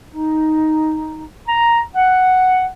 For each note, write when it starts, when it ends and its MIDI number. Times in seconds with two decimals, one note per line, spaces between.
0.10 1.24 63
1.47 1.80 82
1.96 2.66 78